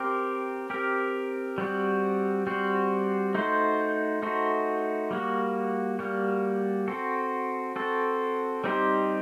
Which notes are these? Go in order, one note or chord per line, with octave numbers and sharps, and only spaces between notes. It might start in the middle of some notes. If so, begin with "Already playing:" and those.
Already playing: C4 G4 A#4
C4 G4 A#4
G3 C4 F#4
G3 C4 F#4
A3 D#4 F#4 C5
A3 D#4 F#4 C5
G3 A#3 F#4
G3 A#3 F#4
C4 F#4 A4
C4 F#4 A4
G3 C4 D#4 G4 C5